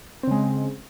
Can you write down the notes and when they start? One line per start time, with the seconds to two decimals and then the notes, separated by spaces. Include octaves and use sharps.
0.23 C4
0.27 C#3
0.31 G#3